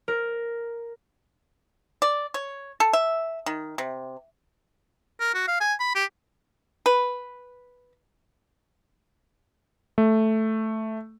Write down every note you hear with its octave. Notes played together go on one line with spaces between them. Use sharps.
A#4
D5
C#5
A4
E5
D#3
C3
A#4
F#4
F5
G#5
B5
G4
B4
A3